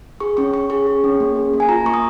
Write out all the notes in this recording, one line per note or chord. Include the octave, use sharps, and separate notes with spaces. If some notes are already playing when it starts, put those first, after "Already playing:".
G#4 C#6
C#4 C#6
C#4 C#6
G#4 C#6
G#4
C#4
A#3
G#4
A#3
G#5
F4 A#5
A#3 C#6
D#6